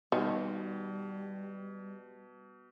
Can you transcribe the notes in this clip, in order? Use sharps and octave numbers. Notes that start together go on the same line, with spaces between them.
B2 D#3 G3